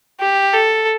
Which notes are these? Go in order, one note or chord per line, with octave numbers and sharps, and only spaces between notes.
G4
A4